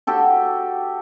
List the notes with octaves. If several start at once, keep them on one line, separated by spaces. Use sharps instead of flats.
F#4 G4 A4 G5